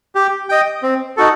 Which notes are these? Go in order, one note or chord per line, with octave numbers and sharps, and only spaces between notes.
G4
D#5 G5
C4
D#4 F#4 A4